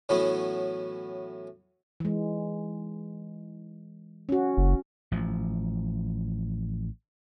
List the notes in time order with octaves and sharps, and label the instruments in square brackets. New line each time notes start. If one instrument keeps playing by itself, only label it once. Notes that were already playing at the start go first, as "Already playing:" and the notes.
[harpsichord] A2 E3 F#3 B3 C#4
[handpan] E3 G#3
C#4 F#4
[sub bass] F#1
[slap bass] A1 F3